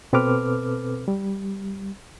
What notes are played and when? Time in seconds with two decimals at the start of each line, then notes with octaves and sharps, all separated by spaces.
0.13 B2 C4 A4 B4 D6 F6
1.08 G3